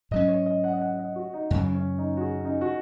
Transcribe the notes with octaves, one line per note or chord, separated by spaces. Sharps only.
G#2 F#3 C#4 D#5
C#5
D#5
F#5
D#5
F#5
D#5
F#4
D#4
F#2 C#3 F#3 C#4
C#4
D#4
F#4
G#4
C#4
D#4
F#4